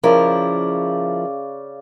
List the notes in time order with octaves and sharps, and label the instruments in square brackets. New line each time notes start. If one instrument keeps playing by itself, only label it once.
[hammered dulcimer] C#3 D5 [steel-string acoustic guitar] F3 E4 A#4